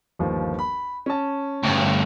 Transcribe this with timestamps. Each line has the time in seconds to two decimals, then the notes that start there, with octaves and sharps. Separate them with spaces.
0.19 G1 D#2 F3
0.59 B5
1.06 C#4 A5
1.64 D2 G2